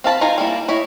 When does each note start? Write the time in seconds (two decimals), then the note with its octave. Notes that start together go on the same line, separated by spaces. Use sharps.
0.04 C4 F5 A5 B5
0.21 D#4 F4 G#4 G#5 A#5
0.38 G3 A#3 E4
0.68 E4 C#5 D#5